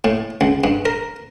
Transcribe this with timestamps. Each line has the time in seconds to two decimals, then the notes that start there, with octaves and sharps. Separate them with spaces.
0.04 A2
0.41 C#2
0.64 G2
0.85 A#4